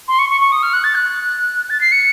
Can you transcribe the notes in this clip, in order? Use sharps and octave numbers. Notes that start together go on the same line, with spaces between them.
C6
C#6
C#6
C#6
D#6
F6
F#6
A6
F#6
A6
C7
C#7